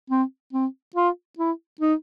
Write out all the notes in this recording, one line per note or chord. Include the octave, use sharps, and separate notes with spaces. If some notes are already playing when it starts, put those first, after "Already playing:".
C4
C4
F4
E4
D#4